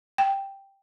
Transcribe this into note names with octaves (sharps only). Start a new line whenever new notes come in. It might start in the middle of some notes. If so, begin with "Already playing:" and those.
G5